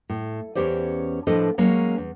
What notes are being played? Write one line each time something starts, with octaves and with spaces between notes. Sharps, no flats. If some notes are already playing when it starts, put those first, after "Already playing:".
A2
E2 G2 C#4 G4 C5 D5
A2 F3 D4 A4 B4 D#5
F#3 G#3 A#3 C#4
E2